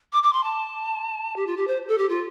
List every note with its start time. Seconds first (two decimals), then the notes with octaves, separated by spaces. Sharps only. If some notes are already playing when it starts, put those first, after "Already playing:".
0.13 D6
0.23 D6
0.33 C6
0.44 A5
1.36 G4
1.47 F4
1.57 G4
1.67 C5
1.88 A4
1.98 G4
2.09 F4